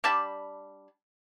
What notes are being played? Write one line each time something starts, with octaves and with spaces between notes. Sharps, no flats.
G3 D4 A5 B5